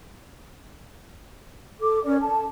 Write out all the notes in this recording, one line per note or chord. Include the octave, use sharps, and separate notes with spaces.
A4 D6
C#4 A#4 D5
A4 A5